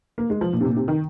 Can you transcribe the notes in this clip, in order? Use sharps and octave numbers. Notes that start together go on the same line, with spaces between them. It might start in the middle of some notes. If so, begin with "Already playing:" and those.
A#3
G#3
F3
A#2
C3
A#2
C3
D#3